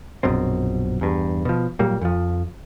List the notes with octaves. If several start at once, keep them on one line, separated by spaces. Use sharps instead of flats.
A#1 F#2 B2 C4
E2 G2
B2 F3
A#2 F#3 G3 A#3
F2 F3